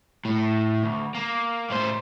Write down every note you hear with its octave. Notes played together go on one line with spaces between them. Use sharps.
A2
D2
A#3
A2 C5